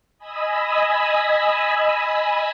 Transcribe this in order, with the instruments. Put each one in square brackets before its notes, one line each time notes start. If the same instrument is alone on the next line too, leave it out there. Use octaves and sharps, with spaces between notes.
[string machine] D#5 G#5 B5 D#6 E6